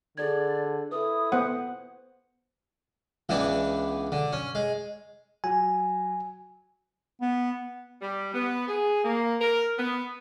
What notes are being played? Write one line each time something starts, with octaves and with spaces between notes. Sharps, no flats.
D3 G#4 A4 D5 G#6
E4 A4 B4 D#6
B3 C5 F#5
C#2 E3 B3 D4
D3
C#4
G#3
F#3 G#5
B3
G3
B3
G#4
A#3
A#4
B3